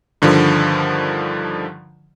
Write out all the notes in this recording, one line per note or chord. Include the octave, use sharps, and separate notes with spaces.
G2 D3 D#3 F3